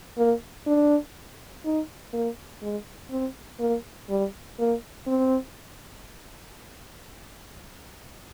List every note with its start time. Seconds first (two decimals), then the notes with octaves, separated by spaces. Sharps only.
0.18 A#3
0.67 D4
1.65 D#4
2.13 A#3
2.62 G#3
3.11 C4
3.60 A#3
4.09 G3
4.59 A#3
5.07 C4